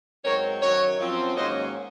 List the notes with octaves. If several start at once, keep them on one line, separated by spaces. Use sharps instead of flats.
G#2 F#3 C4 A#4 C#5
F#2 D#3 F#3 A#4 C#5
F#2 F3 C4
G#2 D#3 F#3 A#3 C#4 C5 D#5